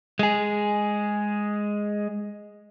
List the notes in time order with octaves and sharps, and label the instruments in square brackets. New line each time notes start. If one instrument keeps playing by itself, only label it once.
[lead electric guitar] G#3 G#4